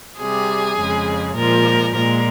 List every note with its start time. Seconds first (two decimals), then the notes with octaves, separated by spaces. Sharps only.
0.19 C3 G3 G#4
0.77 F2 C#3 G#3
1.36 A#2 F3 G#3 A#4
1.94 A#2 G#3 A#4